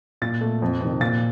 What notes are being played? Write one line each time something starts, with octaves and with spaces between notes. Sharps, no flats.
A#2 A6
A3
F2
C3 D#3
A#2 A6